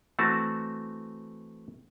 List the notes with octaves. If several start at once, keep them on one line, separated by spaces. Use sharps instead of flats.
E3 A3 C4 F#4 A5